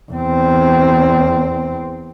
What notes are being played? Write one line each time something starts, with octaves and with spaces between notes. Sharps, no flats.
E2 C4